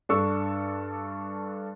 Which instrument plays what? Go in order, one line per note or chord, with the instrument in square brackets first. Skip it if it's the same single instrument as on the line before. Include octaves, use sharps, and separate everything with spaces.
[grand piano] G2 D4 A4 C#6 E6